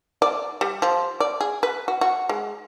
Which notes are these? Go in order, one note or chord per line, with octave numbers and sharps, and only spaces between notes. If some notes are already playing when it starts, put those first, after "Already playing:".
D5
G3
F3
D5
G#4
B4
F#4
F#4
G#3